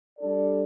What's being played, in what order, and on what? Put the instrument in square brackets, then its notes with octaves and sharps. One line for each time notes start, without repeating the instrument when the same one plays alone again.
[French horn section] G3 D4 A4 D5